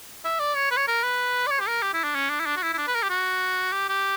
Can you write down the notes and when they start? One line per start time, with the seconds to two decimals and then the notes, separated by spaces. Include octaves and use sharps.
0.25 E5
0.39 D5
0.56 C#5
0.71 B4
0.77 C#5
0.88 A#4
1.03 B4
1.47 D5
1.51 C#5
1.60 G4
1.67 A#4
1.82 G4
1.94 E4
2.04 D4
2.15 C#4
2.30 D4
2.40 E4
2.46 D4
2.57 F#4
2.62 E4
2.74 E4
2.78 D4
2.87 B4
2.95 A#4
3.03 G4
3.10 F#4
3.73 G4
3.89 G4